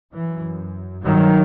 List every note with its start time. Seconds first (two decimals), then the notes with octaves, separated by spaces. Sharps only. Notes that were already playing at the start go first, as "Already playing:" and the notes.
0.14 F#2 E3
1.03 G2 D#3 F#3